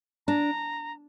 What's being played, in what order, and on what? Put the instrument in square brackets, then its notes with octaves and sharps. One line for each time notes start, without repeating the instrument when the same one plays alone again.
[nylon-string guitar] D4 [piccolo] A#5